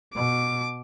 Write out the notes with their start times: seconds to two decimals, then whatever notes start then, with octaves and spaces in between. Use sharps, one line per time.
0.15 B2 D6